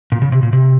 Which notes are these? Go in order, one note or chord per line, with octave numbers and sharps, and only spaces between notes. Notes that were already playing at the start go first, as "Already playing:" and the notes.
A#2
C#3
C3
A#2
C3